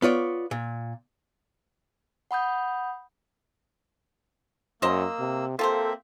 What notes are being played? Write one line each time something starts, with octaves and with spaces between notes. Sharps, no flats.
B3 F4 C#5 D5
A#2
F#5 B5 D#6 G6
F#2 A#3 A#4 C5 D#5 E6
C3
A#3 C4 F4 G4 A4 C5 E5